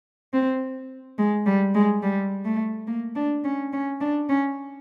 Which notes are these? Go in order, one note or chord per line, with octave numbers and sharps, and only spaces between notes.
C4
G#3
G3
G#3
G3
A3
A#3
D4
C#4
C#4
D4
C#4